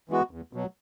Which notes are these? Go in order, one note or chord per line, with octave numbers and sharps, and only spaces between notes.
E3 G#3 B3 F#4
E2
B2 F#3